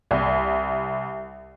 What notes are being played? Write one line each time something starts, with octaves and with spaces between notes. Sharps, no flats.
C2